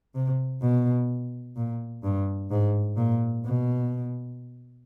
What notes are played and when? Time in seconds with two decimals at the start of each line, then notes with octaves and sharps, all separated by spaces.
0.15 C3
0.62 B2
1.56 A#2
2.04 G2
2.51 G#2
2.97 A#2
3.45 B2